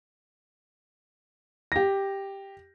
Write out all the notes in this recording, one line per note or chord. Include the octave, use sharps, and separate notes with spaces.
G4 A#6